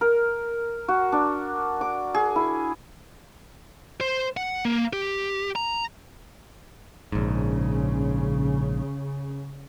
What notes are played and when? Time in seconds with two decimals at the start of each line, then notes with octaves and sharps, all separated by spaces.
0.01 A#4
0.88 F#4
1.12 D4
1.81 D6
2.14 G#4
2.36 E4
4.01 C5
4.37 F#5
4.65 A#3
4.93 G4
5.56 A#5
7.12 A#1 G#2 C#3